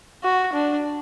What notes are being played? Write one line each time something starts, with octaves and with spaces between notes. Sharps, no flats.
F#4
D4